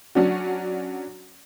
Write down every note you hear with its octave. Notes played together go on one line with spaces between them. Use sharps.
F#3 C#4 D4 F#4